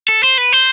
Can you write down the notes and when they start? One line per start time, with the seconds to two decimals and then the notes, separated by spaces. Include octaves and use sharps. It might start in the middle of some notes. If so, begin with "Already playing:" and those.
0.09 A4
0.24 C5
0.38 B4
0.53 C5